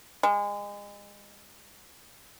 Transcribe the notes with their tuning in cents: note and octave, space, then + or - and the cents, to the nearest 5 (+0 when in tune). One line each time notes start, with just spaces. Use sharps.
G#3 -30